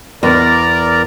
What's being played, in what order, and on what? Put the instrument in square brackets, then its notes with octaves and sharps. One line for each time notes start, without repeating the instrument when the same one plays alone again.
[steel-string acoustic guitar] E2 [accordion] A#4 D5 A#5